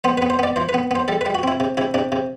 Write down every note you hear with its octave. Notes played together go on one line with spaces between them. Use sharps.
B3 C5
B3 B4
C5
B3 D5
E3 C5
B4
B3
B3 C5
G3 A4
G3 B4
F#4
C4 E4
C3
C3 E4
C3 D4
C3